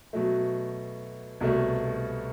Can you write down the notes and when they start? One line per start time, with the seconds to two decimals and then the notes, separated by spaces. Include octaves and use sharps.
0.13 B2 F#3 A3
1.41 C2 B2 A3